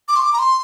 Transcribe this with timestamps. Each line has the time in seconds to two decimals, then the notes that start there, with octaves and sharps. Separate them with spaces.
0.08 D6
0.16 C6
0.22 D6
0.33 A#5
0.39 C6